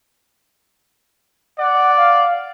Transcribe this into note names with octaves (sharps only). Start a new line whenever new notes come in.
D5 F#5
F5